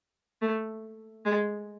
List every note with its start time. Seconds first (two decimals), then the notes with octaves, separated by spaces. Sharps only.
0.42 A3
1.26 G#3